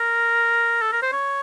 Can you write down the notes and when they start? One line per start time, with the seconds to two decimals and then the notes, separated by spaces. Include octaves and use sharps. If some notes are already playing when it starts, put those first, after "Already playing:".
Already playing: A#4
0.82 A4
0.92 A#4
1.02 C5
1.12 C#5